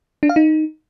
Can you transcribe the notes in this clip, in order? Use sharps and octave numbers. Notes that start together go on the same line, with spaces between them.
D4
F5
D#4